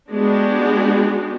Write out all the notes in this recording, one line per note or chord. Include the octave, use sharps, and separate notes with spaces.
G#3 B3 D4 F#4 G4